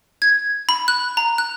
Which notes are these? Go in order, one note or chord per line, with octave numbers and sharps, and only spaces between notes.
G#6
B5
F#6
A#5
F#6